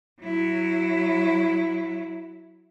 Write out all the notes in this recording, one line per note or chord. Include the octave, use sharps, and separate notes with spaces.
F#3 E4